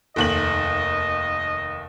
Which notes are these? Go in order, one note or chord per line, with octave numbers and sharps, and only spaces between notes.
F1 D#2 D#5 F#7